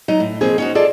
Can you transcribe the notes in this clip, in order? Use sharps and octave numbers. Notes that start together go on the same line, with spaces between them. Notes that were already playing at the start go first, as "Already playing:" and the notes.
F#3 D#4 D#5 A#5
A2
B2 F3 A#3 C4 G#4
C#4 D#4 F#4
F4 G#4 A4 D5 D#5 A5